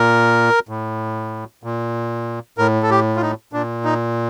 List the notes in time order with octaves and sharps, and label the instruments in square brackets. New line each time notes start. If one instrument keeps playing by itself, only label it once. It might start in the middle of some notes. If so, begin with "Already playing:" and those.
Already playing: [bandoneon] A#2 A#4
A2
A#2
A2 A#4
A4
G4
F4
D#4
A#2 D4
D#4